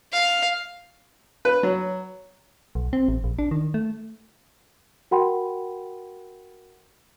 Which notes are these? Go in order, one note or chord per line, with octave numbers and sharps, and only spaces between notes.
F5
B4
F#3
B1
C4
A1
A#1
D4
D#3
A3
F#4 A#4 F#5 G5 B5 C6